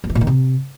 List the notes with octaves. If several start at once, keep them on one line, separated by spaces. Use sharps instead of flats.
G2
E3
A#2
D#3
C3